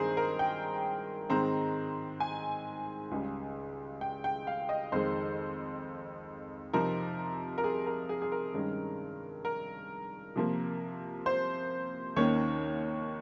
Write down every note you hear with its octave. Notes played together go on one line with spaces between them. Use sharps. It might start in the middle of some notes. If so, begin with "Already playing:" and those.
Already playing: G2 D#3 G#3 C4 D#4 G#4 A#4 C5
A#4
G5
G#2 D#3 G#3 C4 A#5
G#5
C#2 C#3 G3
G5
G5
F5
D#5
F2 D#3 G#3 C5
C3 F3 C4 D#4 A#4
A#4
G#4
A#4
G#4
G#4
A#4
G2 D#3 G#3 C#4
A#4
C3 F3 A#3
C5
D#2 D#3 A#3 C#4 C#5